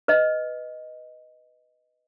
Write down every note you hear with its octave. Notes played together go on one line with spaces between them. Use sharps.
B4 D#5